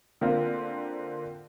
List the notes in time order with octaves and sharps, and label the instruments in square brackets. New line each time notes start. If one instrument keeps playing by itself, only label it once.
[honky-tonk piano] D3 A#3 C4 F4